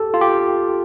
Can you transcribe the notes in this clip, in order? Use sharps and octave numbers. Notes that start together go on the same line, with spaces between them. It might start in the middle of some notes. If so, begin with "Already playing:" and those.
Already playing: G4 A4
F4
G4